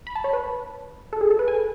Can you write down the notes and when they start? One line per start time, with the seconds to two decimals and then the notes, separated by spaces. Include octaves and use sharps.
0.07 B5
0.15 A5
0.24 C#5
0.33 B4
1.13 A4
1.21 G#4
1.31 A4
1.39 B4
1.48 G#5